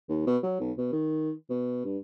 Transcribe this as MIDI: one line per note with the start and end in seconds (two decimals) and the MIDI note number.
0.09 0.26 39
0.27 0.37 47
0.43 0.56 54
0.60 0.72 35
0.78 0.89 47
0.92 1.32 51
1.50 1.81 47
1.85 1.98 43